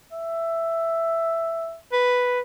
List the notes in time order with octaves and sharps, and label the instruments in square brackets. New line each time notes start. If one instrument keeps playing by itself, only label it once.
[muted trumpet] E5
[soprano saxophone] B4